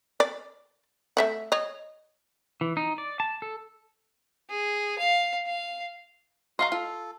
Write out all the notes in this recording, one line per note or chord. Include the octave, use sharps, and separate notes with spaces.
D5
A3 E5 F#5
C#5 D#5
E3
D#4
D5
A5
A4
G#4
F5
F5
F#4 D#5 F5 A#5 C6
F4 A4